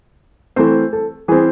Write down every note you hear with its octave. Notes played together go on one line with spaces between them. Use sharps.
E3 A3 C4 C5
A4
E3 C4 G#4